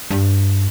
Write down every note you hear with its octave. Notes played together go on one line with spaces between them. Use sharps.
G2